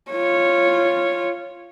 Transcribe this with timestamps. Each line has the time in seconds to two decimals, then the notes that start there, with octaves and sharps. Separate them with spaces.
0.11 F4 C#5